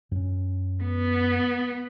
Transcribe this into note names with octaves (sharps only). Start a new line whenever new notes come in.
F#2 C#4
B3